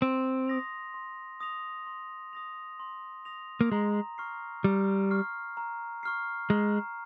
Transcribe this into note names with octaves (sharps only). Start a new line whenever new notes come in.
C4 C6
D#6 A#6 F7
C6
D#6 A#6 F7
C6
D#6 A#6 F7
C6
D#6 A#6 F7
A#3
G#3 A#5
C#6 F6 C7
G3 A#5
C#6 F6 C7
A#5
C#6 F6 C7
G#3 A#5